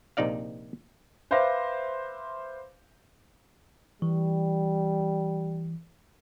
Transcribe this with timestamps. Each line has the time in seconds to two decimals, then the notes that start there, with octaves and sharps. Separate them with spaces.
0.17 A#1 C3 D#4 D5 F5
1.31 B4 C5 E5 F5 D6 A#6
4.02 E3 G3